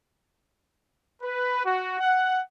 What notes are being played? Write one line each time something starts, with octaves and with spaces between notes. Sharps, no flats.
B4
F#4
F#5